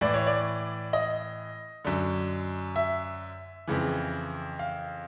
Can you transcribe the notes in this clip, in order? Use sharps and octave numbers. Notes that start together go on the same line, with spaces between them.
A2 E3 D5
C#5
D5
D#5
F#2 D3
E5
F2 C#3 E3
F5